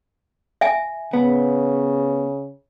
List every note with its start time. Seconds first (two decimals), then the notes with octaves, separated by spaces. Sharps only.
0.61 E5 G#5
1.13 C#3 B3